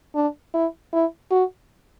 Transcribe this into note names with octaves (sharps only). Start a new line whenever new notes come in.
D4
E4
E4
F#4